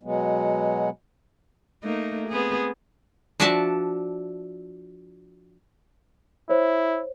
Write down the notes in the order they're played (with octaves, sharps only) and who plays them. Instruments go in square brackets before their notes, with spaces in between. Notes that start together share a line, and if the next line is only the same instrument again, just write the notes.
[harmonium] B2 F#3 G#3 B3
[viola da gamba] A3 A#3 D#4
B3 C4 G#4
[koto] F3 D4 F#4 D5 E5 A5
[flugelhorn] E4 [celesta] C5 C#5